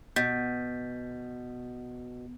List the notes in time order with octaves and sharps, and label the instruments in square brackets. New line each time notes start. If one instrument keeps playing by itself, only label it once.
[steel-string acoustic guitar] B2 [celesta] G6 A6 B6